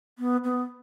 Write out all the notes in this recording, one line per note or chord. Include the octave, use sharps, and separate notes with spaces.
B3
B3